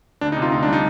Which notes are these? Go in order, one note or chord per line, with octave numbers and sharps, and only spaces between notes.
D2 D4
D#4
C3
F4
D2 D#4
D4
G3 D#4